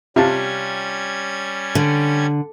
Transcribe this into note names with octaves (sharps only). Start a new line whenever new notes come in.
C3 G3 C#4 F4 A5 G#6
D3